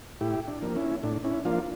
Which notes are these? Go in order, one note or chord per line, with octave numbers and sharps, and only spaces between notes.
A2 E4 G4
D4
F3 A#3
C#4 E4
A2 D4
C#4 E4
F3 A#3 D4 F4